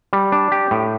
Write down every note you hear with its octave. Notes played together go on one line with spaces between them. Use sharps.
G3
D4
G4
A2